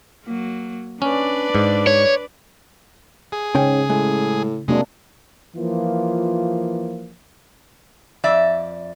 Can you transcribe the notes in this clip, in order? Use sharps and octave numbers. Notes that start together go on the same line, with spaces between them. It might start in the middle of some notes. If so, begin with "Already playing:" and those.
F#3 A#3
C#4 D4 B4 D5
G#2
C#5
G#4
G#2 C#3 C#4 G5
A2 G#3
F#2 C3 G#3 A#3 D4
E3 F3 A#3 F4
F2 D5 E5